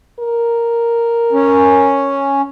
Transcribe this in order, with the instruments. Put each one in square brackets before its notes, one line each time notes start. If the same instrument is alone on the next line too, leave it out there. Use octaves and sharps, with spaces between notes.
[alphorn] A#4
[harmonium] C#4